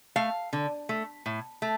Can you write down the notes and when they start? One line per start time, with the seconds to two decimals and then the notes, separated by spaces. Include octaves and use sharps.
0.16 A3 F5
0.53 D3
0.89 A3
1.26 A2
1.62 A3